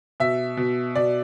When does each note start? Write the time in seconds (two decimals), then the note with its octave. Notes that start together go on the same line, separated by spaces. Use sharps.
0.20 B2 E5
0.57 B2
0.96 B2 D5